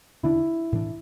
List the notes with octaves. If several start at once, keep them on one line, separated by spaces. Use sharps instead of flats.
E2 D3 B3 D4 E4
A2 E3 D4